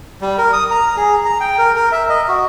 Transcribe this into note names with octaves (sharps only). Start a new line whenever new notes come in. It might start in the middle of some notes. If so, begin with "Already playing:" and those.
G3
A#4
D#6
A#5
G#4
A#5
G5
A#4
A#4
E5
D#5
F#4